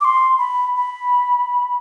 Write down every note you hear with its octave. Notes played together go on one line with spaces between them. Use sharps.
D6
C6
B5
B5